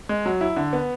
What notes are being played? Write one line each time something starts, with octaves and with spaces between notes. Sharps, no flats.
G#3
F#3
E4
D3
B3